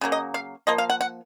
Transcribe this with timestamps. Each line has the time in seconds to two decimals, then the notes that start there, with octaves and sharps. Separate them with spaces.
0.01 C#3 F#3 A#3
0.12 D#5
0.34 F5
0.67 F3 A#3 D#5
0.78 F5
0.90 F#5
1.01 F#5